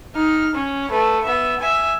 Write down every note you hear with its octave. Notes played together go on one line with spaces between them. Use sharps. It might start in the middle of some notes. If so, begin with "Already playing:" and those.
D#4 F6
C#4
A3 B4
B3 E5
E5 G#5